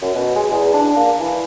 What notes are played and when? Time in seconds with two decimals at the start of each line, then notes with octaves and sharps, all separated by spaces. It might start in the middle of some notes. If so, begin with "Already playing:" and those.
0.01 F#2
0.15 B2
0.35 G#3
0.51 E2
0.74 D4
0.96 A#3
1.19 E3